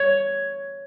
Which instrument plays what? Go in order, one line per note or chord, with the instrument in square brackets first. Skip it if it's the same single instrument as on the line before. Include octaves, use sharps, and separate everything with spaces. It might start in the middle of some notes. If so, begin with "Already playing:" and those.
Already playing: [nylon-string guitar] C#5